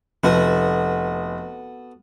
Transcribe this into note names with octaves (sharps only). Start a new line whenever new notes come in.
F1 B3 F#4 A4